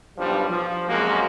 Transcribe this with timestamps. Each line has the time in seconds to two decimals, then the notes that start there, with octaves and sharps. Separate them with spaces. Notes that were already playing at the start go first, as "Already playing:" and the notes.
0.18 B1 G2 F3 G3
0.49 F3
0.89 F#2 C3 G#3 A#3 F#4